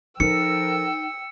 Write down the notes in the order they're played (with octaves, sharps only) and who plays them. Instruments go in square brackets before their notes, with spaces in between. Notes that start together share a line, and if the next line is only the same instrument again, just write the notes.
[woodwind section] F3 A4 A#4 [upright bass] D#4 [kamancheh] G5 E6 [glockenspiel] C#7